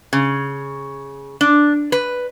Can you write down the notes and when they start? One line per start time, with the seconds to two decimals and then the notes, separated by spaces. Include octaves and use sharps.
0.13 C#3
1.41 D4
1.92 B4